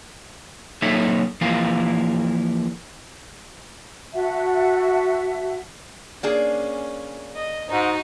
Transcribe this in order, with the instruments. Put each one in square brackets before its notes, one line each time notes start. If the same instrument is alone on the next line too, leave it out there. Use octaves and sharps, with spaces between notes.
[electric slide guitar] F#3 A#3 D#4 A4 C#5 E5
E3 F3 A#3 E4 A#4 F5
[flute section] F#4 E5 F#5 A5
[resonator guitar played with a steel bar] A#3 D4 G#4 [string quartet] C#4
[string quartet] D#5
[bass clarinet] G#2 [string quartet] D#4 F#4